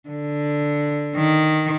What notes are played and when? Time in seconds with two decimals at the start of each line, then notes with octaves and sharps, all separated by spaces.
0.09 D3
1.16 D#3